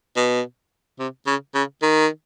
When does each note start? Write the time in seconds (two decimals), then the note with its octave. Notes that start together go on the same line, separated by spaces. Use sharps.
0.16 B2
0.99 C3
1.27 C#3
1.55 C#3
1.82 D#3